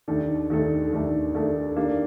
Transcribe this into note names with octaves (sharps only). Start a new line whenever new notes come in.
D#2 D#3 A3 D4 A4
D#2 D#3 A3 D4 A4
D#2 D#3 A3 D4 A4
D#2 D#3 A3 D4 A4
D#3 A#3 D4 G4